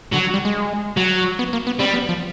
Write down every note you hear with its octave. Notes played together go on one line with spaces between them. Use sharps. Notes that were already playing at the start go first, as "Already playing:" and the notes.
D3 F#3
G3
G#3
F#3
B3
A#3
B3
G3 C4
B3
F3